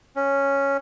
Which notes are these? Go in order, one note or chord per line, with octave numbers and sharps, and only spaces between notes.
C#4